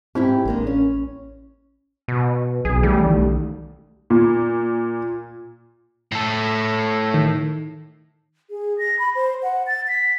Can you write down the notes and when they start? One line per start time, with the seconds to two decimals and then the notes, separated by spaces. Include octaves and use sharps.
0.15 G#2 C4 E4 G4
0.45 A1 G#3 A#3 D4
0.67 C#4
2.08 B2
2.65 B1 B2 G#4
2.83 E3 G3 A3
3.06 B1 D#3 A3
4.10 A#2
6.12 A2 A4
7.14 D#3
8.50 G#4
8.79 A#6
8.99 B5
9.15 C5
9.43 F#5
9.67 A6
9.88 B6